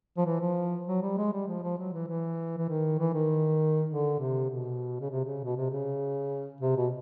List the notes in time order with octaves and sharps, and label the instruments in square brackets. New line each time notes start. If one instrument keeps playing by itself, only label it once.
[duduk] F3
E3
F3
F#3
G3
G#3
G3
F3
F3
F#3
E3
E3
E3
D#3
E3
D#3
D3
C3
B2
C#3
C3
C#3
B2
C3
C#3
C3
B2